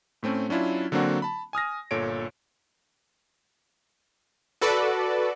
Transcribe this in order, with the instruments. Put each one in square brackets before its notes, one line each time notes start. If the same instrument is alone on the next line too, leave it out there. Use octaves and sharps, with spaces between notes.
[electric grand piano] A2 A3 C4 C#4
F#3 C#4 D4 E4 F4
D3 F#3 A#3 C4 D4 F#4
A5 B5
G#5 D#6 F6 A#6
G1 A#2 A4 C#5 D7
[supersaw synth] F#4 A4 B4 D5